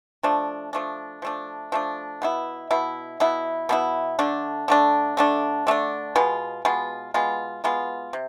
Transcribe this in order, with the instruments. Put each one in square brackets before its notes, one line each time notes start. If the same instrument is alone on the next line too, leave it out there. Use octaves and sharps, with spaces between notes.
[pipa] F3 A3 D4
F3 A3 D4
F3 A3 D4
F3 A3 D4
B2 B3 E4
B2 B3 E4
B2 B3 E4
B2 B3 E4
D3 A3 D4
D3 A3 D4
D3 A3 D4
D3 A3 D4
B2 G#3 B3 F4
B2 G#3 B3 F4
B2 G#3 B3 F4
B2 G#3 B3 F4
C3